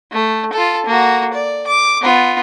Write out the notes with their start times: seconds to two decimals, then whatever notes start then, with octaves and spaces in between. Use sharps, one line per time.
0.12 A3
0.53 F4 A4
0.86 A#3 F#4
1.34 D5
1.67 D6
2.02 B3 F4